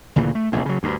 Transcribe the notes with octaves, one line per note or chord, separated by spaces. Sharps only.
D2 A#2 C#3 E3
A3
F1 A#1 E2
C#3 F#3
D2 G2